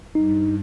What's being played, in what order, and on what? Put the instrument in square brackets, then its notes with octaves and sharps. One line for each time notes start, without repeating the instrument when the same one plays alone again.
[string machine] G2 [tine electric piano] D#4